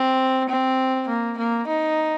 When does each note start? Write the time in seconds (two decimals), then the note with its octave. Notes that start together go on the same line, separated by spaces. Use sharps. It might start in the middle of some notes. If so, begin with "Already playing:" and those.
Already playing: C4
0.49 C4
1.08 A#3
1.38 A#3
1.67 D#4